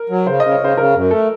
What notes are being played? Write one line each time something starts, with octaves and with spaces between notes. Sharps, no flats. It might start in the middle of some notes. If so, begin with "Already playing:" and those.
Already playing: A#4
F#3
C#3 C5
C#3 D#5
C#5
C#3 C5
C#3 A#4
F#2
A3 A4